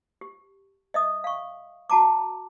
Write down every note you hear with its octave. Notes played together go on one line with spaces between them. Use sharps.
G4
D#5 E5 D#6
F5 C#6
F#4 A5 A#5 D6